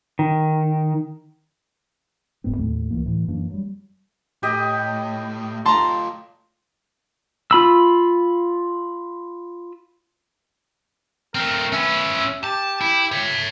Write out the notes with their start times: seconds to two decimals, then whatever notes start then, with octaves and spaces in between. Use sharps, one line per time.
0.19 D#3
2.44 F#1 G#2 B3 C4
2.57 D#2 A2 A3
2.91 C#2 E3 A#3
3.06 A2 E3
3.28 F#2 E3 A#3 D4
3.50 F#3 G3
4.43 A2 G4 D#5
5.66 A3 F4 A5 A#5 C6
7.51 F4 B5 E6
11.35 A3 C4 A#4
11.72 C#4 B4 E5
12.43 G4 A5
12.81 E4
13.12 C#5 E5